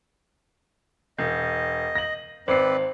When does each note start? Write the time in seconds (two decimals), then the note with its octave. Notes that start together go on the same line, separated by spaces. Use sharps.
1.18 E1 D#5 G6
1.95 A#6 F#7
2.48 G#1 C4 B4 C5 D5 C7